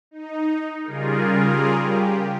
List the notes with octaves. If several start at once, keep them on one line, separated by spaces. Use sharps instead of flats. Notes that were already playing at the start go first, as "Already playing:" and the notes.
D#4
C#3 G3 F4 G#4 A#4
G4